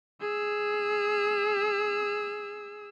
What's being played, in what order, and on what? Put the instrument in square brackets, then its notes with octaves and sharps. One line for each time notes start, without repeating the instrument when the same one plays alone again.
[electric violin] G#4 E6